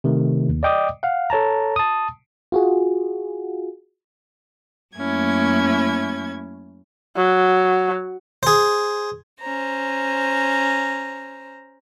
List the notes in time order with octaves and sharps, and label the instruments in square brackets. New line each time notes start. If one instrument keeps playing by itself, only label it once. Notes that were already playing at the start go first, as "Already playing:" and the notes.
[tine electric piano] C3 D#3 A3
D#2
D5 D#5 G5 D6 D#6
F5 F#5
A4 C#5 A5 A#5
A5 D#6
[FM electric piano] F4 F#4 G#4
[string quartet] F#2 A3 A#3 C#4 E4 G#6
[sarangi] F#3
[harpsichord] G#4 C5
[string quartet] C#4 C5 A#5